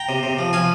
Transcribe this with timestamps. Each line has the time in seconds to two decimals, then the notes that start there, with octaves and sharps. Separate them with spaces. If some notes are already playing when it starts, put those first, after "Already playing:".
Already playing: G5 A#5
0.09 C3
0.23 C3
0.38 F3
0.53 F3 F5 G#5